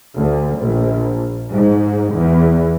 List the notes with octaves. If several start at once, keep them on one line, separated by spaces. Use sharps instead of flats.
D2
A#1
G#2
E2